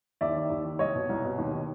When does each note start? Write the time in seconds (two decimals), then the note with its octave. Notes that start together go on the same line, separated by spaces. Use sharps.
0.21 D#2 D5 E5
0.36 D#3
0.50 D#2
0.65 D#3
0.79 C2 C#5 D#5
0.95 B2
1.09 C2
1.24 B2
1.38 D#2
1.53 D#3